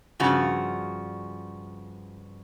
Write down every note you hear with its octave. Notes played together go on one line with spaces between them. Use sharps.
G2 C#3 F3 F#4